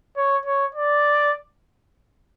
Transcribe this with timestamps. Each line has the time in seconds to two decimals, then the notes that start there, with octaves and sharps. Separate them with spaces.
0.17 C#5
0.46 C#5
0.75 D5